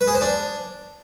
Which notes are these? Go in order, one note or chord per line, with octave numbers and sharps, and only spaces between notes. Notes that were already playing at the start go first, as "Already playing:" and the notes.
B4
G#4
C5
D4